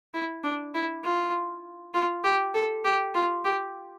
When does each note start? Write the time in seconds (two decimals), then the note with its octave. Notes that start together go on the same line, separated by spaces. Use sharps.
0.14 E4
0.44 D4
0.75 E4
1.04 F4
1.94 F4
2.24 G4
2.54 A4
2.85 G4
3.15 F4
3.45 G4